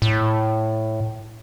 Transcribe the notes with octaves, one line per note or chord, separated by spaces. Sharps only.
A2